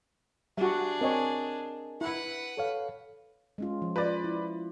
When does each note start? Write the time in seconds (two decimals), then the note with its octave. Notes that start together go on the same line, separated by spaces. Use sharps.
0.58 G3 D4 F#4 G#4 E5
1.01 C4 A#4 C#5 D#5 G#5
2.01 E4 B4 F#5
2.57 A4 C#5 F5
3.58 G#3 C#4 F4
3.82 F3
3.96 F4 B4 D5
4.24 E4